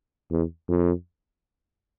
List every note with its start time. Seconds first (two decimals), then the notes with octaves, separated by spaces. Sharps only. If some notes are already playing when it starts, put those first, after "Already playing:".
0.31 E2
0.69 F2